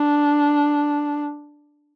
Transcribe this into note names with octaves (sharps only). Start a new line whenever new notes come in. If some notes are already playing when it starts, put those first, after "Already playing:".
Already playing: D4